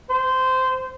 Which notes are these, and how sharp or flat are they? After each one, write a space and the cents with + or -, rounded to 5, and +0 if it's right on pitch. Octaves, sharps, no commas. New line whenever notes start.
C5 -15